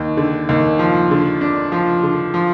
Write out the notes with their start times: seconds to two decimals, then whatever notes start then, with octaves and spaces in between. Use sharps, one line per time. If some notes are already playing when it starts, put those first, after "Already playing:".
Already playing: D#2
0.17 D3
0.49 D#2
0.79 F3
1.11 D3
1.41 D4
1.72 F3
2.03 D3
2.34 F3